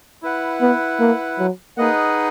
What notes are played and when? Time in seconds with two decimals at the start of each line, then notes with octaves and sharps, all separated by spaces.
0.22 E4 B4 F#5
0.61 B3
1.00 A#3
1.39 F#3
1.77 A#3 D#4 G#4 B4 D#5 F#5